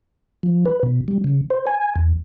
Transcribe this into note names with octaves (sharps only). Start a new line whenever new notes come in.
F3
B4
B2
G3
C#3
C5
G#5
E2